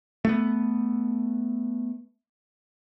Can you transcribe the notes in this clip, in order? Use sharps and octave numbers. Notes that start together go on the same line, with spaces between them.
A3 B3